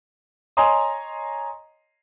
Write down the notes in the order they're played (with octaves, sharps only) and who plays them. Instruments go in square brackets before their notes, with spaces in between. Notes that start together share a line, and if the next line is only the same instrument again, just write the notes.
[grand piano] C#5 D#5 G#5 A#5 C6 D#6